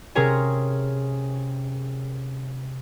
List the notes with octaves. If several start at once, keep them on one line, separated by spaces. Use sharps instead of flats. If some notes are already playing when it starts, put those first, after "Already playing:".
C3 C#4 G#4 A#4 C#5 G#5